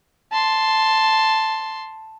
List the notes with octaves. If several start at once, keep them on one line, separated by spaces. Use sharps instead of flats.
A5 C6